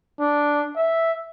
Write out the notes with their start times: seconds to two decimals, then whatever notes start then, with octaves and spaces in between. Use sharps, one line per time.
0.20 D4
0.76 E5